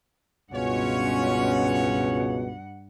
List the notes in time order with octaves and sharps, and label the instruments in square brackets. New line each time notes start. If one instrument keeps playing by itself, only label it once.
[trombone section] C#2 B2 [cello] G2 F#5 [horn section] C#4 F4 C#5